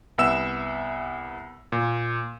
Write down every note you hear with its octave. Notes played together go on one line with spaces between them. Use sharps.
C2 B3 E5 E6 E7
A#2